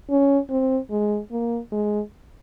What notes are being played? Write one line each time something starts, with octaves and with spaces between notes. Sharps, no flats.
C#4
C4
G#3
A#3
G#3